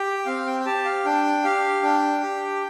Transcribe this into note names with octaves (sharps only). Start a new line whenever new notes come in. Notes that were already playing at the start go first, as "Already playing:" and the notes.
Already playing: G4 G5
C4 F5
G5
G5
G4 A5
F5
D4 G5
G4 F5
D4 G5
G4